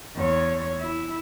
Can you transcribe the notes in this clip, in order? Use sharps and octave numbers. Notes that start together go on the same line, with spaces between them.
E2 C#5
E4